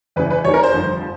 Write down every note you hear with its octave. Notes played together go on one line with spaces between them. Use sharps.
E2 C#3 E3 B4
B4
E2 C3 D#3 C#5
A#4
C5
G1 F2 D3 F3
F3